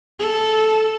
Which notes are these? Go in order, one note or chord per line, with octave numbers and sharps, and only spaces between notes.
A4